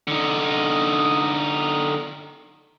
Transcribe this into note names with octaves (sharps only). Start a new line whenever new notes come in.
D3 D#4